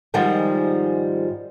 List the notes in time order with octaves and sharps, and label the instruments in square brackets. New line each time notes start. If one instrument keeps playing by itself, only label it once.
[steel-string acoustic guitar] G#2 D#3 F3 G3 G#3